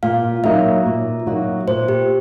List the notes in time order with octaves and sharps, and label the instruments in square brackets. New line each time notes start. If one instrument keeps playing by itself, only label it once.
[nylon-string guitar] A#2 [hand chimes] F5
[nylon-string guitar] F#3 A#3 D#4 F#4 [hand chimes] E5
[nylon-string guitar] A#2
F#3 A#3 D#4 F#4
[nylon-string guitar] A#2 [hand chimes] C5
[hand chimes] G4